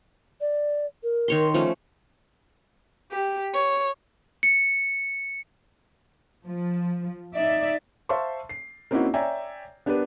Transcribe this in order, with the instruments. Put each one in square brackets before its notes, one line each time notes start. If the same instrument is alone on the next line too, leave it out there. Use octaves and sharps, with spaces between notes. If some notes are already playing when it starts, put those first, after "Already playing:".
[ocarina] D5
A#4
[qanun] D#3 C#5 C6
F3 A3 C#4
[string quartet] G4
C#5
[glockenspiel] C#7
[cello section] F3
D#4 D5 E5
[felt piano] C5 E5 F5 A5 C6 C#6
C7
A#3 C4 C#4 D#4 E4 F#4
C#5 D5 E5 G5 G#5 A#5
B3 D4 G4 A#4 B4